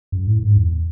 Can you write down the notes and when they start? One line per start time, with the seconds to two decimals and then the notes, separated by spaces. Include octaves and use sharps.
0.12 F#2
0.27 A2
0.43 G#2
0.57 E2